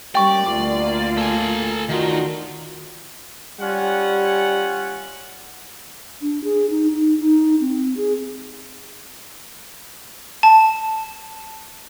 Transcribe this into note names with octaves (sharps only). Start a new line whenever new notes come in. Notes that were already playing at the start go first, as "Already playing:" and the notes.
G3 A#3 C#4 G4 D5 G5 C#6
D2 C3 F3 F4 A#4 D6
A#3
A4 G#5
D#3 D4 D#4 F4 F#4 A#4
G3 C#4 F4 F#5
D4
G#4
D#4
D#4
D#4
C4
G#4
A5